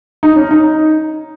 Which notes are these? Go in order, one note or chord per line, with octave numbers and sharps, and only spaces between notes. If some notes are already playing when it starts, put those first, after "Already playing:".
D#4
C#4
D#4